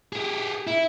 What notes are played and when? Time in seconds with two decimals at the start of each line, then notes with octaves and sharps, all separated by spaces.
0.13 G4 G#4
0.67 E4